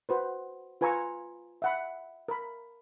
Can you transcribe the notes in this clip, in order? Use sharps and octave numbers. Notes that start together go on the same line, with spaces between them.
F#4 B4 C5
F4 B4 G#5 A#5 C#6 E6
E5 F#5 B5
A#4 B5